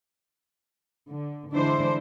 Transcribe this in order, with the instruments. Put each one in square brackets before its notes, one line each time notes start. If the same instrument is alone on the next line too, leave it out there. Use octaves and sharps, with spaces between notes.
[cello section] D3
D3 E3 G#3 D4 E4 C5